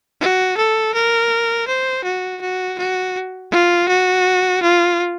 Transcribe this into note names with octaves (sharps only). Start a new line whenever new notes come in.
F#4
A4
A#4
C5
F#4
F#4
F#4
F4
F#4
F4